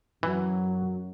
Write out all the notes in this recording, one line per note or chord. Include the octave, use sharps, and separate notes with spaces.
F#2 E3 F#3